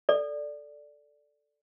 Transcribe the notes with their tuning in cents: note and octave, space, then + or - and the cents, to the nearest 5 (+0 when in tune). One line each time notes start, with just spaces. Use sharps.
A4 +0 D5 +0